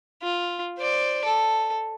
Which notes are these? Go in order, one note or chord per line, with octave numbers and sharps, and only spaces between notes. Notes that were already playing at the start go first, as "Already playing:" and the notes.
F4
C5 D5
A4